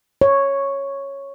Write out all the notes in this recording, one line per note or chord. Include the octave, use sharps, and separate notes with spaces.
C#5